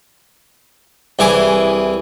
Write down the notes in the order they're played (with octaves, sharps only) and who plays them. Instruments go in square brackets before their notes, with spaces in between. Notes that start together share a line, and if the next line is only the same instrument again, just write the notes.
[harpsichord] C2 E3 G#4 D6